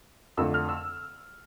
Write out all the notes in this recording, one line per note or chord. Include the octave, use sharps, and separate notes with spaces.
F2 D3 A3 E6
F6
E6